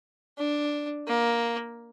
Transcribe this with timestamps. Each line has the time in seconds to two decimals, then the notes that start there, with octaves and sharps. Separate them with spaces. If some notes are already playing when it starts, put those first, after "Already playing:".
0.38 D4
1.07 A#3